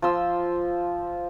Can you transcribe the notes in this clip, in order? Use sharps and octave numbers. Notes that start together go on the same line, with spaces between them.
F3 F5 C6 E6